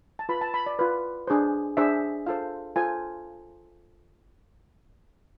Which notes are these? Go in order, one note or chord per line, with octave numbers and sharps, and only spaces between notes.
A5
F4 B4 B5
A5
B5
D5
F4 B4
D4 G#4 C5
D4 G#4 C5 E5
F4 A4 C5 F5
F4 A4 C5 G#5